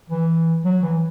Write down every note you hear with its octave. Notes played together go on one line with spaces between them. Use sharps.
E3
F#3
E3